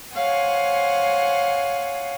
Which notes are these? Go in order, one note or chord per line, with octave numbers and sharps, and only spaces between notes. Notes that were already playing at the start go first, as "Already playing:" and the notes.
C5 C#5 F5 F#5 G#5